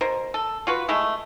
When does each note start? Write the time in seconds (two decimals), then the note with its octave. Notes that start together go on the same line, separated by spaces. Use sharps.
0.01 B2 A#4 C5
0.34 A4
0.67 F4 F#4 B4
0.88 G#3 A3 E4 G#4